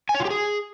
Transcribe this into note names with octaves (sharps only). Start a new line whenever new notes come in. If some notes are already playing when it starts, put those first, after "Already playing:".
G#5
C#5
F4
G4
G#4